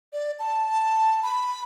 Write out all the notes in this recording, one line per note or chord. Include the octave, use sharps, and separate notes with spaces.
D5
A5
B5